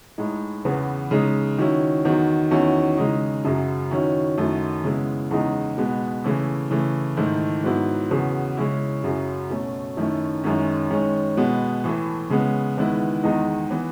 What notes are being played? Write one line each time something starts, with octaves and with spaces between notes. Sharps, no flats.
A2 G#3 D#4
E2 C#3 E3 B3
C#3 G#3 D#4
D#3 F#3 C#4 E4
E2 D#3 F#3
E2 D#3 F#3 C#4 E4
C#3 G#3 D#4
F#2 C#3 F#3
D#3 F#3 C#4 E4
F#2 D#3 F#3 A3
C#3 G#3 B3 E4
E2 C#3 G#3 D#4
B2 G#3 B3
C#3 E3 A3 E4
C#3 E3 A3
G#2 D#3 A3 E4
G#2 F#3 B3 E4
E2 C#3 F#3 B3
C#3 G#3 C#4 E4
F#2 C#3 F#3
B2 A3 C#4
F#2 D#3 A3 C#4 E4
F#2 D#3 G#3 C#4
D#3 G#3 C#4
B2 G#3 B3
A2 E3 A3
C#3 G#3 B3
E2 D#3 G#3 B3 E4
E2 D#3 G#3 D#4
E3 B3